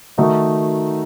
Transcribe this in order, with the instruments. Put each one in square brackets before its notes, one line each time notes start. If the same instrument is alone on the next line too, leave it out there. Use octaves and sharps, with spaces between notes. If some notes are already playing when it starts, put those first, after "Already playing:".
[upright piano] D#3 A3 D#4 F#4